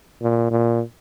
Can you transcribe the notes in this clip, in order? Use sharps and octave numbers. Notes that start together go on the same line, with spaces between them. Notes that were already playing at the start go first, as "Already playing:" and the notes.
A#2
A#2